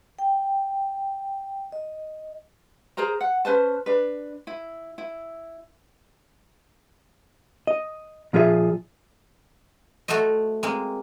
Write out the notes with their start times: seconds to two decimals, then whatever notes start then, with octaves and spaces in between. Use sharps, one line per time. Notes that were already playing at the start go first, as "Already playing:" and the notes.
0.19 G5
1.72 D#5
2.97 G#4 A#4 C5 A#5
3.20 F#5
3.45 C#4 B4 C5 A5
3.86 D4 B4
4.47 E4
4.98 E4
7.67 D#5
8.33 A#2 F3 F4 G#4 B4 E5
10.08 A3 F#4 A4 C5 D#5
10.63 G#3 A#3 C4